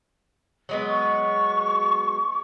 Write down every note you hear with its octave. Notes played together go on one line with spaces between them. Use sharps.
F#3 G#3 B3
C#6